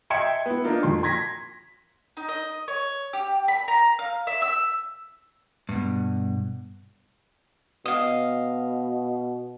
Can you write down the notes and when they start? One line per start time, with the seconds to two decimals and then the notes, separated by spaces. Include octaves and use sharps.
0.10 D#5 E5 G5 C6 G#6 C#7
0.46 B3 E4
0.64 A#3 D4 D#4 F4 A#4
0.83 F2 C6
1.03 C6 G#6 A#6 B6
2.17 D#4
2.28 D#5
2.68 C#5
3.13 G4
3.48 B5
3.68 A#5
3.99 F5
4.27 E5
4.42 E6
5.69 G2 B2
7.85 B2 D#5 F5